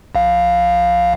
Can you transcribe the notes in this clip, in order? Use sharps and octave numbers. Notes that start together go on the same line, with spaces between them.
A#1 F5